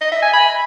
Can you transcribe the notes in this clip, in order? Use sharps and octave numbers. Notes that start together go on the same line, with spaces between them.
D#5
E5
G#5
B5